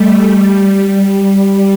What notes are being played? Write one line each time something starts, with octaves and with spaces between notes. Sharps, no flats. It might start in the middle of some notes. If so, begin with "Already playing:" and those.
Already playing: G3 A3
G3